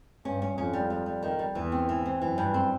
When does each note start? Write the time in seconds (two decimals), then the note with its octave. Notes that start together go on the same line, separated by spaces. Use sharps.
0.25 G2 C#4
0.42 C#4
0.58 F2 C#4
0.73 G3
0.90 G3
1.06 G3
1.23 D#3
1.39 G3
1.55 E2 E3
1.72 C4
1.89 E3
2.06 C4
2.22 F#2 E3
2.38 G2
2.54 C4